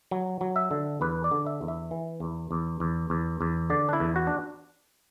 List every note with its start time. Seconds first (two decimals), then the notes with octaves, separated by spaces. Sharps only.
0.11 F#3
0.41 F#3
0.56 E5
0.71 D3
1.01 E2 B4
1.24 D5
1.31 D3
1.46 E5
1.61 E2
1.68 E5
1.91 E3
2.20 E2
2.51 E2
2.80 E2
3.10 E2
3.41 E2
3.70 D3 D5
3.89 D4
3.93 E4
4.00 E2
4.16 F#4
4.27 D4